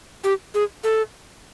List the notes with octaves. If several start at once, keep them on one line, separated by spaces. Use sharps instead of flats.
G4
G#4
A4